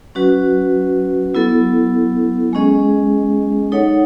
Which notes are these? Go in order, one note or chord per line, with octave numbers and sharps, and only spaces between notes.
F#3 C#4 F#4 B4
F#3 B3 E4 A4
G#3 C#4 G#4 D#5
D#4 A4 C#5 F#5